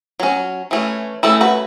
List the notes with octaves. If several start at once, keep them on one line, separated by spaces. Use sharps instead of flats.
F#3 C#4
E3 A3 C#4
E3 A3 C#4 E4 A4
F#4 B4